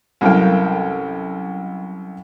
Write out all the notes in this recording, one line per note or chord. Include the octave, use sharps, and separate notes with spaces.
C2 F#2 A4 A#4 F5 G5